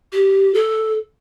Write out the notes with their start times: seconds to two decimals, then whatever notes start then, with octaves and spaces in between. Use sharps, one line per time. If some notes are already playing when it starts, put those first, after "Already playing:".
0.12 G4
0.54 A4